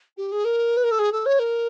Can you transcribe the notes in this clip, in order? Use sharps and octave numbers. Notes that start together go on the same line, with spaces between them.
G4
G#4
A#4
B4
A#4
A4
G#4
A4
C#5
A#4